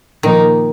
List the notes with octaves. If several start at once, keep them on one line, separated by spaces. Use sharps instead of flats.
A#2 D#3 F3 A#3 D#4 A#4